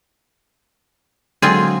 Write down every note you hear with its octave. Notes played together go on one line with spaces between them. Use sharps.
D3 F#3 G#3 C4 F4 G#4